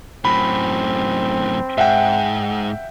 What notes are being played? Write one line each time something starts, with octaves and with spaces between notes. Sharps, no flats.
F#2 A2 C4 B5
G#2 E5 F#5 G5